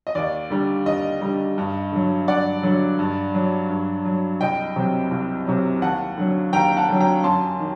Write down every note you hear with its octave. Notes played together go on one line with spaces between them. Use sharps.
D#5
D#2 D5
D3 G3
D#2 D#5
D3 G3
G2
D3 F#3
G2 D5 F#5
D3 F#3
G2
F#3
G2
F#3
C2 D#5 G5
C3 F#3
C2
C3 F#3
D#2 F#5 A5
D3 F#3
D#2 G5 A#5
F#5 A5
D3 F#3
G5 A#5
F#2 A5 C6
D#3